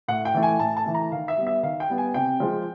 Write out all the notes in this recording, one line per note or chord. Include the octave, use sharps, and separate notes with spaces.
A2 F#5
G5
E3 A3
G#5
A2 A5
A5
E3 A3
A#5
D#3 F5
E5
G3 B3
E5
D#3 F5
G5
G3 B3
G#5
C3 G5
F3 G#3